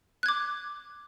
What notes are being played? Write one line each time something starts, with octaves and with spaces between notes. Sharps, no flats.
D6 F#6 G#6